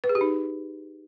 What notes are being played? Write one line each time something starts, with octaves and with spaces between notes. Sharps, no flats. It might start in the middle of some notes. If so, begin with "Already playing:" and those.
B4
G#4
G4
D#4